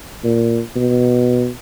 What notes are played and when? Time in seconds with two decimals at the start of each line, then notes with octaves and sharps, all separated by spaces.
0.24 A#2
0.76 B2